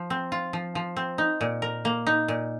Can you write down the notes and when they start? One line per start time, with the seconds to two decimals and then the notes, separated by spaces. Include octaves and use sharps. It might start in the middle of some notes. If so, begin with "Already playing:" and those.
Already playing: F3
0.10 C4
0.32 F4
0.53 F3
0.75 F3
0.96 C4
1.18 D#4
1.41 A#2
1.62 A#4
1.85 A#3
2.07 D#4
2.28 A#2